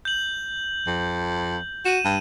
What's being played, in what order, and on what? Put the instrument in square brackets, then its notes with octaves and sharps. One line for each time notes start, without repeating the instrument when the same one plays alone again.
[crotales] G6 F#7
[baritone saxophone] F2
[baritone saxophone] F#4 [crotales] D#7 E7
[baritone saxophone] G2